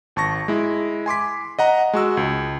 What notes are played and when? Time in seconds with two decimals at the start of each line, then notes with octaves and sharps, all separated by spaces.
0.16 G#1 A5 C#6 A#6
0.48 G#3 E4
1.06 G#5 C6 D6 B6
1.59 D#5 F#5 A#5
1.93 G#3 F#4 E6
2.17 C#2